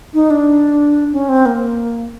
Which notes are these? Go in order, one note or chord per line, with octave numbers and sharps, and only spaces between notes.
D#4
D4
C#4
C4
A#3